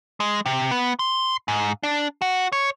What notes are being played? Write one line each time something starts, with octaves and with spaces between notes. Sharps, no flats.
G#3
C3
B3
C6
G#2
D4
F#4
C#5